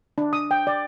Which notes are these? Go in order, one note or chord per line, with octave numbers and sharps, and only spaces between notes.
D4
D#6
G5
D5